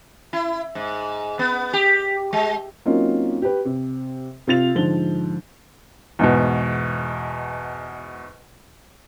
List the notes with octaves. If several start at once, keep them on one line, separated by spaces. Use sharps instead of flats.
E4
G#2
B3
G4
G#3
F#3 A#3 C4 C#4 D#4 F4
G4 B4
C3
C3 F4 A6 F7
G#2 D3 F3 G7
E2 G#2 B2